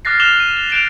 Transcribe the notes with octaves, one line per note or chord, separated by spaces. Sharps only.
D6 F6 F#6 A6 A#6 C7
D6 F6 F#6 E7 F7 G7
D#7
G7
F#6 G6 D7 E7 F7